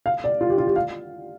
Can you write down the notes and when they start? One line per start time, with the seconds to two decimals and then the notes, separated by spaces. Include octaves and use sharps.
0.06 F5
0.24 D5
0.41 F4
0.50 G4
0.58 F4
0.67 G4
0.76 F5